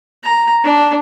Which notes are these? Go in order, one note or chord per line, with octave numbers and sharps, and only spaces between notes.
A#5
D4